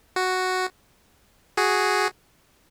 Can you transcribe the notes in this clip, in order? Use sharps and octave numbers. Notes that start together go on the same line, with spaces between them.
F#4
F#4 G#4